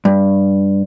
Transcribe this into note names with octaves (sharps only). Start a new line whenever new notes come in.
G2